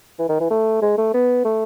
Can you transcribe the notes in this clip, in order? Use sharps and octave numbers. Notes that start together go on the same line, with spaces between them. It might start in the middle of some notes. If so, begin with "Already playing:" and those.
E3
D#3
E3
A3
G#3
A3
B3
A3